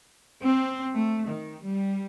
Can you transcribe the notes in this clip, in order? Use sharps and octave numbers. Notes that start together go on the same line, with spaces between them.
C4
A3
D#3
G3